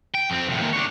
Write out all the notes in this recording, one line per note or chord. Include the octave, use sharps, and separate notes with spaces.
G5
F2 C4
C2 A2
D#2 A#2
D4 C#5